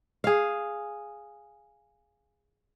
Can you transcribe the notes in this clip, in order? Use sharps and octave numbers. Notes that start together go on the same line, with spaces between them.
G#4 F5